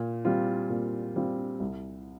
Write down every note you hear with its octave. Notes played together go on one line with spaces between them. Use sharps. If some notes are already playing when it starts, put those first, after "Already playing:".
Already playing: A#2
G3 C4 F4
A#2
G3 C4 F4
C2